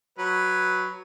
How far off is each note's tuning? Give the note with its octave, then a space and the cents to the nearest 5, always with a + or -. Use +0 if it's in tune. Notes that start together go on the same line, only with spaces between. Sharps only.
F#3 +0 B4 +0